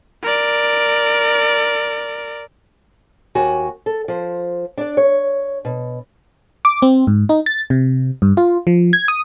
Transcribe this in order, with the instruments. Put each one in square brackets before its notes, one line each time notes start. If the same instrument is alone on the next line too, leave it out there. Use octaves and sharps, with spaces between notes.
[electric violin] A#4 D5
[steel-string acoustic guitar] D#2 F#4 G#5
A4
F3 C5
D4 D5
C#5
B2
[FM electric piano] D6
C4
G#2
D#4
A6
C3
G2
F4
F3
G#6
D#6